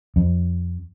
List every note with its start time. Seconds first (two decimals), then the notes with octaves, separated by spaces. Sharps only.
0.16 F2